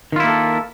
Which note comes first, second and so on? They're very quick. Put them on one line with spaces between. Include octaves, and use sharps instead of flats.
D#3 F4 E4 A#3 A4